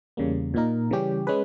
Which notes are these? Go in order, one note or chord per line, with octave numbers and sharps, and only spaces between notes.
E2 C#3 G3 A#3
A#2 A#3 D#4 A#4
C#3 E3 G3 C#4 G4
G#3 C#4 G#4 B4